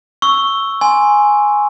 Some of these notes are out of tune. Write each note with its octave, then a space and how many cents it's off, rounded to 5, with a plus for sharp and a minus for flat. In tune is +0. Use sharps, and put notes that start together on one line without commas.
C#6 +0 E6 +0
G#5 +0 C6 -5